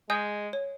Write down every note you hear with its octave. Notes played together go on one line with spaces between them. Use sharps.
G#3 D#5 G#5 D#6 G6
C#5